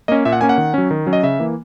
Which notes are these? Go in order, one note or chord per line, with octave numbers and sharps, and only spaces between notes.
A#3 C#4 D#5
A#2 E5
F#5
A#3 C#4 G#5
F#5
D#3
F#3 C#4
D#3
F#3 C#4
D#5
C#3 E5
E3 A#3